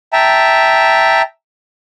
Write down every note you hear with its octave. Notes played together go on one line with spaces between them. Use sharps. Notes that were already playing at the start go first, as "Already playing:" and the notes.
E5 G5 A5 A#5